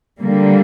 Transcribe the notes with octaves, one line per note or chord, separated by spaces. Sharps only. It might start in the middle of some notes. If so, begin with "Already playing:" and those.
D3 G3 A#3